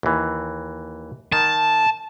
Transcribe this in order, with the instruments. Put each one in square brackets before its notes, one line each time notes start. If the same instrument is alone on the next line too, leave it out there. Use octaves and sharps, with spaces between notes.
[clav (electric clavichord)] D#2 E3
[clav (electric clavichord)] D#3 [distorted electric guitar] A5